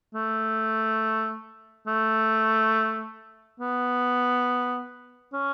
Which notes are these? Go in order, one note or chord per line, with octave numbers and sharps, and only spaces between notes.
A3
A3
B3
C#4